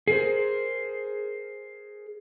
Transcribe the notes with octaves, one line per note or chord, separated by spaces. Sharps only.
G#4 A#4 C5